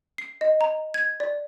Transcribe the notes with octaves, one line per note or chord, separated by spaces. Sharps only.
C7
D#5
A#5
G#6
D5